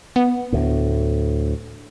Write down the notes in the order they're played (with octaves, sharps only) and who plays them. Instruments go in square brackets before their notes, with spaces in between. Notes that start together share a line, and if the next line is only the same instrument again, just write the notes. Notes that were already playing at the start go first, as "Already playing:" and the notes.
[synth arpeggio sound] B3
[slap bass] D2 A2